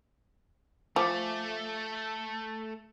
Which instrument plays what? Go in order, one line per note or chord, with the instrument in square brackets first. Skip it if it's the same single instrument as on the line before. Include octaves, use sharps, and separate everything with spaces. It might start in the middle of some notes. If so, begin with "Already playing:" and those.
[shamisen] F3 [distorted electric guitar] A3 [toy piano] F5 G#5 D6